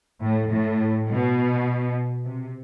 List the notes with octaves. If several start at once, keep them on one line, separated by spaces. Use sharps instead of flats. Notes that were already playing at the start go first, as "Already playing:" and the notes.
A2
A2
B2
C3